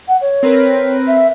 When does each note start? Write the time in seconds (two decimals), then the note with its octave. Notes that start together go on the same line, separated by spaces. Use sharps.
0.08 F#5
0.21 C#5
0.43 C4 A#4 B4
1.08 E5